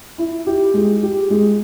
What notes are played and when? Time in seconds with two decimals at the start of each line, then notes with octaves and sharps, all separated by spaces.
0.18 E4
0.47 G4
0.74 G#3
1.03 G4
1.30 G#3